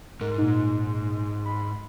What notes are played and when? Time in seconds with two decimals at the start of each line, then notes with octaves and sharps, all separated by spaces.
0.21 G#2 A#4
0.38 A#2 D#4
1.45 B5 C6